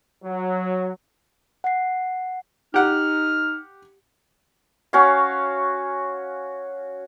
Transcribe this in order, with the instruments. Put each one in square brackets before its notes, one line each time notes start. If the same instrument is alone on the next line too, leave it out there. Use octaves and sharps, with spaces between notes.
[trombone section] F#3
[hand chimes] F#5 C7
[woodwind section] D#4 F6 [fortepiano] G4 F#5
[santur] C#4 F#4 C#5 F5